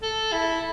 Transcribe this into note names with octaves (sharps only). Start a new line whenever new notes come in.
A4
E4